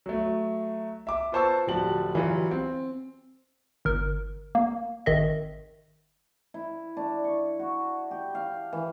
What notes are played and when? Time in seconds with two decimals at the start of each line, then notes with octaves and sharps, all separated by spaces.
0.06 F#3 A3
1.07 E5 D6
1.32 F4 B4 C5 A5 C#6 E6
1.67 D1 F3 G3 F#4 A5 F#7
2.15 E3 F#3 G3 F4
2.51 C4
3.85 G1 A#4
4.55 A#3
5.06 G#1 D#3 D#5 E5
6.54 E4
6.97 D4
7.24 C#6
7.60 F#4
8.11 G4
8.35 F5
8.73 E3